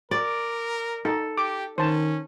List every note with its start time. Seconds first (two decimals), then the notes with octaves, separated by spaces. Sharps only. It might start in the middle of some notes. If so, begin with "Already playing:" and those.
0.11 A#4 D5
1.05 D#4 A4
1.37 G4 D6
1.78 D#3 C#4 C5 A5